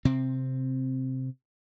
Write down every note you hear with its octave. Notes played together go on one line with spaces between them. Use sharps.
C3 C4